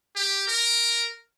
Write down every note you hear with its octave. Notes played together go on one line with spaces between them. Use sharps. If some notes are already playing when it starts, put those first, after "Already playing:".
G4
A#4